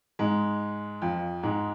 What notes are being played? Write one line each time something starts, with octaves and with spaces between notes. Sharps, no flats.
G#2 G#3
F2 F3
G#2 G#3